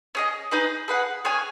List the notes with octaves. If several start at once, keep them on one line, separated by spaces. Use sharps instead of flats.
C#4 G#4 D#5
D#4 G#4 B4 D#5
G#4 B4 F#5
C#4 G#4 C#5 G#5